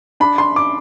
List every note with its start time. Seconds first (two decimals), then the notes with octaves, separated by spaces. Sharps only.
0.20 D4 B5
0.38 C6
0.56 D6